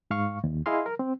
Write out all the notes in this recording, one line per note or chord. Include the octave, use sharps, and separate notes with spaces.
G#2 F5 C#6
D#2
E4 G#4 D#5 F5 C6
A#4
C4